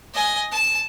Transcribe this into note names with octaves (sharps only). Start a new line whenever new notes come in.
D#5 G#5
A5